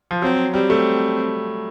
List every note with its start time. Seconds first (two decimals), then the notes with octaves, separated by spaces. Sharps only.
0.11 F3
0.22 F#3 C4
0.54 G3 C4
0.70 A3